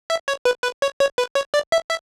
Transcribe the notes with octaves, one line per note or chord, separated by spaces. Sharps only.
E5
C#5
B4
B4
C#5
C#5
B4
C#5
D5
E5
E5